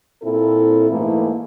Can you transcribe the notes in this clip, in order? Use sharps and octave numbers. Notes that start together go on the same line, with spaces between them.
A#2 C4 E4 A4
G#2 E3 A3 A#3 E4